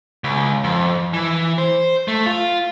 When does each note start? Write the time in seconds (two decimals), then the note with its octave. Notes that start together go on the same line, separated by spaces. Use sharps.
0.24 C#2
0.64 F2
1.14 E3
1.58 C5
2.08 A3
2.26 F4